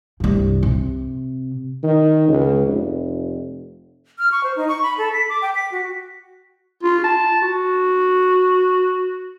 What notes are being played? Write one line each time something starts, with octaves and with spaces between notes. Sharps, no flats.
C2 G2
C3
D#3
C#2
F1
F6
C#6
C5
D#4
C#6
B5
A4
B6
D6
G5
B6
F#4
F4
A5
F#4